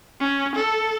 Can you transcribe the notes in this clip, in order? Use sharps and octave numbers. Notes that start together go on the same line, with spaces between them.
C#4
A4